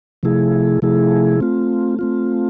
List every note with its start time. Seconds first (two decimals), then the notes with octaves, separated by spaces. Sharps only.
0.23 C3 F3 A3 E4 G#4
0.82 C3 F3 A3 E4 G#4
1.40 A3 C4 F4
1.99 A3 C4 F4